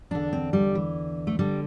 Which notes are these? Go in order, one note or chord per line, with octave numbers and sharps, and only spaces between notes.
E2 D3 D4
C4
G3
E3
A3
D3 G3